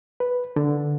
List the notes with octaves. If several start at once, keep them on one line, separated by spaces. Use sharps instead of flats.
B4
D3